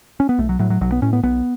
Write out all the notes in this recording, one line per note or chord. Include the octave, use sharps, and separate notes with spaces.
C#4
B3
B1 A3
F#3
A2 F#3
F#3
B1 F#3
B3
A2 C#4
B3
B1 B3